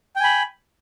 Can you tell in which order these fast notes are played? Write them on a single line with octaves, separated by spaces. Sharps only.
G5 G#5 B5